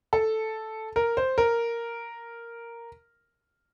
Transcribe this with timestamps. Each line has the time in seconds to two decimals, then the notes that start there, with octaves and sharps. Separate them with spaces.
0.13 A4
0.96 A#4
1.17 C5
1.38 A#4